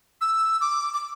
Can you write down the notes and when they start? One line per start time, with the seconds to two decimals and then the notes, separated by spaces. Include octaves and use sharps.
0.21 E6
0.61 D6
0.94 D6